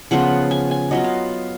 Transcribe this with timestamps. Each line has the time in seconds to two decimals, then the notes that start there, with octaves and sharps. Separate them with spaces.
0.11 C#3 F3 B3 F4 F#5
0.51 G#5
0.71 G#5
0.91 F#3 B3 F4 D#5
1.04 F5